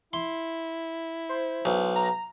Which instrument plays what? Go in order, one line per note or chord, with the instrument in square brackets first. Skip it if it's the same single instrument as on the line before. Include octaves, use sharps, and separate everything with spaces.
[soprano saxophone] E4 [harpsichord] C6
[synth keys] C5
[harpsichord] B1
[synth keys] A#5